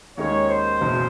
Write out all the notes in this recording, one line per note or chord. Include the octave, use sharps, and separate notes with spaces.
D#2 D#3 G#3 C#4 C#5
C5
F#1 E2 B2